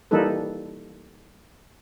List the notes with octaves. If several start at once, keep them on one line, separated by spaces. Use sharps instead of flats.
E3 G3 A#3 D#4 A4 B4